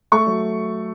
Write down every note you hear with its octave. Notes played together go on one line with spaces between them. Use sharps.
A3 C#6
F#3